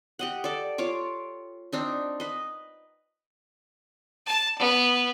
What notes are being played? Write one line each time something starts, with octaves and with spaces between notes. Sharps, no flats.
G4 D#5 F#5
A4 D5
F4 C#5 D6
C4 D4 D#4
B4 D#5
A5
B3